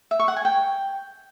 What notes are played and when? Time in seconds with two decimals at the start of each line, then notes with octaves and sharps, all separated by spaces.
0.11 E5
0.19 C#6
0.28 F#5
0.36 G#5
0.45 G5